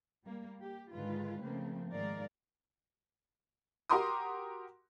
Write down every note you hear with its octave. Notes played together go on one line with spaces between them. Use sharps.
G3 A#3
G4
G#2 D3 D#3 G#3 F4 B4
C#3 F3 A3 A#3 C4
G#2 D#3 F3 A#4 D5 F5
F#4 G4 A#4 C6 D6 D#6